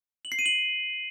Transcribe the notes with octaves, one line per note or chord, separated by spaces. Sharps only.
F#7
C7
D#7
F#7